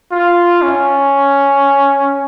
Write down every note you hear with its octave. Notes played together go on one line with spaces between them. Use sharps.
F4
C#4